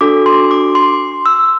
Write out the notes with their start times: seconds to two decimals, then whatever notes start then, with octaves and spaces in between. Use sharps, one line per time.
0.01 D4 F#4 A4 D6
0.26 C6
0.51 D6
0.75 C6
1.26 E6